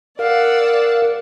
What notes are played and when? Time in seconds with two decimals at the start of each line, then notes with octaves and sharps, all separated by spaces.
0.19 A#4 D5 F5 F#5 E6